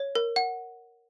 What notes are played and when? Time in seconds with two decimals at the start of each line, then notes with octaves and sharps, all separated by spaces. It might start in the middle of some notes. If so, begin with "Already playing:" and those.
Already playing: C#5
0.15 A#4
0.36 F#5